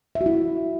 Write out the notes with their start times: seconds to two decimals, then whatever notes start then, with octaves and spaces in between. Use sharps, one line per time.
0.15 E5
0.21 F#4
0.26 E4